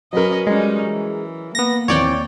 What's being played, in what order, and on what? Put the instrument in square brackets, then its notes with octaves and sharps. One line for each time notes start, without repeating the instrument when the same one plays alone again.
[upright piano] F#3 A#4 [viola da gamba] C#4 B4 D#5
[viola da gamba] G3 C#4 D#4 [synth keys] G#3
[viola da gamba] E3
[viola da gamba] A#3 [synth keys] B3 A#6
[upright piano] D#2 E3 C4 [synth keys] C#5 D5 G5